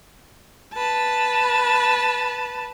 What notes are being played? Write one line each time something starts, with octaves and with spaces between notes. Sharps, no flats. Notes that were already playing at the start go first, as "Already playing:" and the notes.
B4 A5